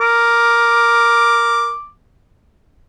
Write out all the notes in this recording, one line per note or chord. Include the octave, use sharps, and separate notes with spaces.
A#4 D6